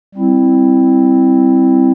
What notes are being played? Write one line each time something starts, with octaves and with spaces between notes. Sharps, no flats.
G3 C4 E4